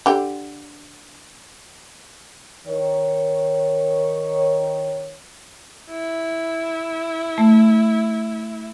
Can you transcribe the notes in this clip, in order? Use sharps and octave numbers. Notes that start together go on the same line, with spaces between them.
D3 G4
D#3 C#5
E4
A3